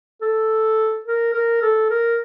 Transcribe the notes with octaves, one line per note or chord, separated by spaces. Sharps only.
A4
A#4
A#4
A4
A#4